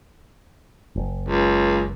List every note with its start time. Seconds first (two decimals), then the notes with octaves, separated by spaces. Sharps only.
0.96 F#1
1.28 C#2